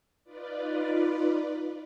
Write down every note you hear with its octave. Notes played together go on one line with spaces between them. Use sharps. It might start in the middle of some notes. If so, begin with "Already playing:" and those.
D#4 F4 B4 D5